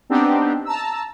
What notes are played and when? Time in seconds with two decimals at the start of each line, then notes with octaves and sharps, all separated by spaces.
0.10 B3 C4 D4 D#4 G4
0.65 A5 A#5 E6